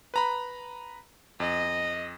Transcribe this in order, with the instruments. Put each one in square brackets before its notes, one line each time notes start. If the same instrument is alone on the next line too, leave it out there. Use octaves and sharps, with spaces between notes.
[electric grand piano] B4 A#5 B5
[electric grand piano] F2 [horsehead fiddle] D#5